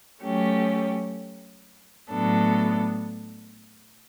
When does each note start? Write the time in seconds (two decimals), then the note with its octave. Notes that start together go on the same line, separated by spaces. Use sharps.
0.22 F#3 A3 C#4 G4
2.10 A2 F#3 B3 D4 A4